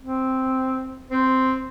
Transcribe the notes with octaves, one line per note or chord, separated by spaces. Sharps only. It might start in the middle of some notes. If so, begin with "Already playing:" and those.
C4
C4 C5